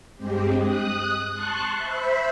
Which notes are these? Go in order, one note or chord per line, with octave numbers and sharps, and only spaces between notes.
G2 G#3 C4 G4
D#6 F#6
A5 C6 C#6 F#6
C5 E5 B5